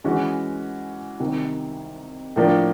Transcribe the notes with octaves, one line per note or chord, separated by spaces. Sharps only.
E3 G#3 C#4 F#4
C2 C3 D#3
A2 F3 A#3 D4 F4